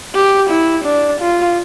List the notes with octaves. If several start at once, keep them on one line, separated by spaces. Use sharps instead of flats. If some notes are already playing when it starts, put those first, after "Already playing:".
G4
E4
D4
F4